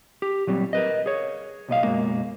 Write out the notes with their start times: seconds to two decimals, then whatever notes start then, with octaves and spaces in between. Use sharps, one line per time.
0.22 G4
0.47 A#2 F#3 G3 C4
0.73 A#4 B4 D#5
1.06 G#4 C#5
1.68 B1 A#2 D#5 F5
1.83 F#2 B2 G#3 A#3